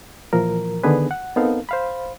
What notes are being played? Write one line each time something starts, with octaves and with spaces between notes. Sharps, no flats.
A#2 E3 F3 A#4
D3 D#3 B3 D4 G#4 B4
F#5
B3 C4 D#4 A4 A#4 F5
C5 F5 B5